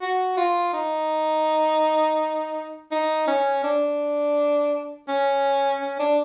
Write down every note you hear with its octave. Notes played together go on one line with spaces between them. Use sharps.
F#4
F4
D#4
D#4
C#4
D4
C#4
C#4
D4